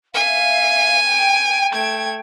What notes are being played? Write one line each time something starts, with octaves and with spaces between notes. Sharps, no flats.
E5 F5 G#5
G5
A3 G#6